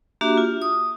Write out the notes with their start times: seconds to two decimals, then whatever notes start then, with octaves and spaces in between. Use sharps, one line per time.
0.21 A#3 D4 F#4 G4 E5
0.38 F4
0.62 D#6